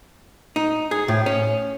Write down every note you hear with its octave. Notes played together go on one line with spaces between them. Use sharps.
D#4
G#4
A2
C#4